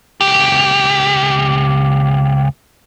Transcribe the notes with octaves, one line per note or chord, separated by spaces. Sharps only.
C#2 G4